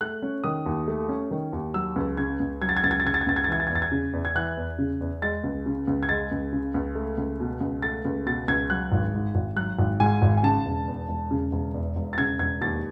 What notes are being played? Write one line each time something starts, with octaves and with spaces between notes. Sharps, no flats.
A3 F#6
C#4
D#3 D#6
D#2
A3
C#4
D#3
D#2
F#3 E6
C#2
C#3 G#6
C#2
F#3 G#6
A6
G#6
C#2 A6
G#6
A6
C#3 G#6
A6
G#6
C#2 A6
G#6
A6
E3 G#6
A6
G#6
E2
A6
G#6
C#3
E2
G#6
E3 F#6
E2
C#3
E2
G#3 A6
C#2
C#3
C#2
G#6
G#3 A6
C#2
C#3
C#2
A3
C#2
B2
C#2
A3 A6
C#2
B2 A6
C#2 G#6
F#3 F#6
G#1
G#2
G#1
F#3 F#6
G#1
G#2 G#5
G#1
G#5
C#3 A5
E1
E2
E1
C#3
E1
E2
E1
A6
C#3 G#6
E1 G#6
D#2 A6